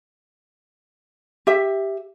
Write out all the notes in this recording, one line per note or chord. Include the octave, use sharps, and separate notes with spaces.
G4 E5